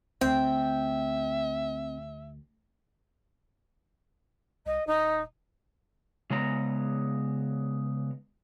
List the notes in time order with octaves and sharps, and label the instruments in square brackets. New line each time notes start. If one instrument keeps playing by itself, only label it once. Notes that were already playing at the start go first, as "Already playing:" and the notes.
[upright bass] D2 [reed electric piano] C4 [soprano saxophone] E5 [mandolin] G5
[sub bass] C2 [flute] D#5
[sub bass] D#1 [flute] D#4
[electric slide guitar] C#3 G#3 B3 A#5